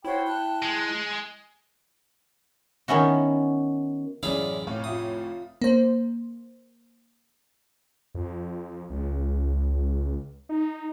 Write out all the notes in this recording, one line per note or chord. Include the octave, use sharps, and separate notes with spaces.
E4 F#4 C5 C#5 G5
A5 F#6
G#3
D#3 B3 C#4 E4 F#4
A1 F#2 C#4 E4 G#4 D5 F5
F1 A2 C#5 F5
F4 E5 D#6
A#3 C5
F2
C#2
D#4